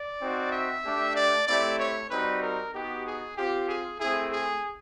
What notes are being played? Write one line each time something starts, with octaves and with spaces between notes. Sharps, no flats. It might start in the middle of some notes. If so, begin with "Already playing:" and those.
Already playing: D5
C4 D#4 F#4
E5
A3 D4 G4
D5
A3 C4 E4 G4 D5
C#5
G3 C4 D#4 F#4 B4
A#4
B3 D#4 F#4 G4
G#4
C4 F4 G4
G#4
A3 C4 E4 G#4
G#4